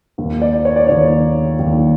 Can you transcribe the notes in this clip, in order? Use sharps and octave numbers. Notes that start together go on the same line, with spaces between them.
D#2 D#3
D5
C#5
D5
D#2 D#3 C#5
D#2 D#3